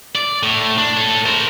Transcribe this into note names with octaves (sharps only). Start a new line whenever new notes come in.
D5
A2
D4
A4 C#5
A#4 C5